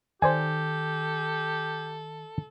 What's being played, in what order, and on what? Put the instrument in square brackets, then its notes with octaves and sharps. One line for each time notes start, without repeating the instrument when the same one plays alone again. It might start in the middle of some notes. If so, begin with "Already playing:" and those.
[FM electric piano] D#3 [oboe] G4 [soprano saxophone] A4 [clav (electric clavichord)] C5 D5 G#5